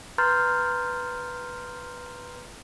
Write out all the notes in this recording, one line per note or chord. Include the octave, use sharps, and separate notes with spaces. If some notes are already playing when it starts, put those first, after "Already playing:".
B4 A#5 C6 F6 G6 A6